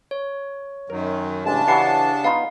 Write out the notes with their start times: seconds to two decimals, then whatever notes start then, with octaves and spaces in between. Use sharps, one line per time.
0.11 C#5
0.90 F#2 D#3 F#3 A#4
1.45 A1 C#3 G#3 D4 A5
1.68 E3 F#3 G4 F#5 C7
2.24 B3 D#4 F4 F5